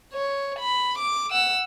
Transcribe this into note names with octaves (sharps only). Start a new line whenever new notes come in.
C#5
B5
D6
F#5 E6